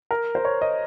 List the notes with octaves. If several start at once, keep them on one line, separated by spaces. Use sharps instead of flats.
A#4
C5
C#5
D#5